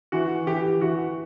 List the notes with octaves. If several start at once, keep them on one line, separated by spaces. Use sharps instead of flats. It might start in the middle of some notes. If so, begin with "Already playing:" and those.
E3 F#4
E3 G4
E3 F#4